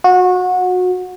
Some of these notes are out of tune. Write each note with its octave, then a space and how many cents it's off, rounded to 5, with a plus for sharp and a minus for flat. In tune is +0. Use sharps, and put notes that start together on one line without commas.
F#4 -25